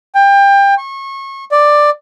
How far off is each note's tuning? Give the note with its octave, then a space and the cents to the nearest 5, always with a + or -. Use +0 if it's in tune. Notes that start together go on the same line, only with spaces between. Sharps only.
G5 +25
C#6 -30
D5 +10